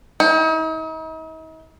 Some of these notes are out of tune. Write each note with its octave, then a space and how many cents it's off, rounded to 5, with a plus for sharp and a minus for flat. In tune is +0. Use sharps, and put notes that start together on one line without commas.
D#4 +45